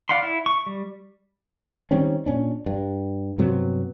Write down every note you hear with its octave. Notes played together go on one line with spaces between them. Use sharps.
D5 F5 F#5 B5 C6
E4
C#6
G3
D#3 G3 C4 C#4
A#2 C#4 D4
G2
G2 C3 F#3 B3